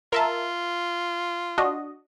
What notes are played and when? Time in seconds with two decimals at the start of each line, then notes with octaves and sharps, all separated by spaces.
0.12 F4 A#4 E5 A5
1.58 D4 F#4 D#5